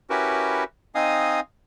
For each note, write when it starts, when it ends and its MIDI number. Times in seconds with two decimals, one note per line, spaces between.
0.10 0.64 61
0.10 0.64 64
0.10 0.64 66
0.10 0.64 67
0.10 0.64 70
0.10 0.64 71
0.95 1.40 60
0.95 1.40 63
0.95 1.40 75
0.95 1.40 77
0.95 1.40 80
0.95 1.40 87